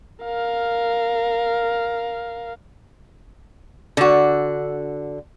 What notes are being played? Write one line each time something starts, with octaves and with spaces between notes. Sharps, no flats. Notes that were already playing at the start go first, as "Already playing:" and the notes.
A#4 F5
D3 F#4